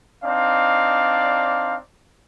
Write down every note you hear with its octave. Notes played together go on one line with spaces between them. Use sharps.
C4 D4 D#4 D5 F5